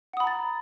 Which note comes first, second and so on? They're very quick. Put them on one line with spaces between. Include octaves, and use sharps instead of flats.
F#5 D#6 B5 A#5 A6